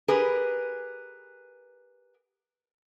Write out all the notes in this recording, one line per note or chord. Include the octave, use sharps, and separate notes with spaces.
G4 G#4 A#4 B4